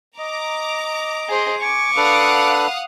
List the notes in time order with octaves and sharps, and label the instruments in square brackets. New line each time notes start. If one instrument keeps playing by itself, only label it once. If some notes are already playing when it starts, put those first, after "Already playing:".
[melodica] D#5 [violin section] A#5 D6
[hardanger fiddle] G#4 C5
[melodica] G#5 [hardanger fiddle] C#6 D6
[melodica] D4 A4 B4 [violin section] F5 F#5 D#6